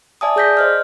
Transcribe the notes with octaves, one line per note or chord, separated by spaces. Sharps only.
D5 E5 G#5 A5 D#6
G#4 D5 G6 A#6 B6
C5 D#5 F6